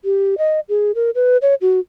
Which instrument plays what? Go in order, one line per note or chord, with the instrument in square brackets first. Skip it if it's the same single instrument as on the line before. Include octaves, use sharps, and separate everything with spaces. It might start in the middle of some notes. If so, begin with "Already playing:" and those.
[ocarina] G4
D#5
G#4
A#4
B4
C#5
F#4